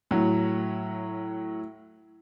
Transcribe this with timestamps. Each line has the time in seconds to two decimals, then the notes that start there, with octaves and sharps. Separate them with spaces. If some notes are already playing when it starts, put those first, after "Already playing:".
0.11 A2 F#3